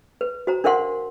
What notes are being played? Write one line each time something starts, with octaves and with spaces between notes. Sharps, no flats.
B4
F#4 C5 A#5
D4 A#4 C5 F5 F#5 C6